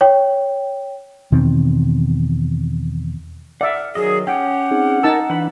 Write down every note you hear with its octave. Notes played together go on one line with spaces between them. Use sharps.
C#5 G5
E2 B2 D#3 C4
D5 E5 F#5 F6
D#3 F#3 G#4 D#5
C#4 G4 F#5 G5
C4 D#4 G#4
D#4 A#4 G#5 A5 E6
E3 D4 B4 B5